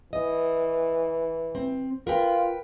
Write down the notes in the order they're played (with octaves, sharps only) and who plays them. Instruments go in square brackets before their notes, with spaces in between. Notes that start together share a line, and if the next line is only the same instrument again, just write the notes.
[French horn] E3 [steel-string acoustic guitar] D#5
[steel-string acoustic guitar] C4
[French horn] F4 [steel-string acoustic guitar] A#4 B4 G5